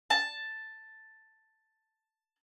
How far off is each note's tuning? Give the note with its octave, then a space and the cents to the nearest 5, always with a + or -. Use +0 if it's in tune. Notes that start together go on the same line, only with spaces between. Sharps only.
A5 +5